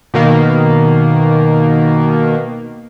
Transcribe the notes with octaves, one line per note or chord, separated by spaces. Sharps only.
B2 D#3 A#3